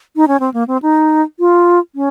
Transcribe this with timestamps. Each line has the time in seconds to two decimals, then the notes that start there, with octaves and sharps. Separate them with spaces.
0.16 D#4
0.28 C#4
0.40 C4
0.54 A#3
0.68 C4
0.82 D#4
1.39 F4
1.95 C#4